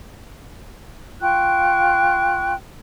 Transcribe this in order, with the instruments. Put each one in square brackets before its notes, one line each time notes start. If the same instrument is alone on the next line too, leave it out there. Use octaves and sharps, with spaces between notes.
[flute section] F4 G5 C#6 F#6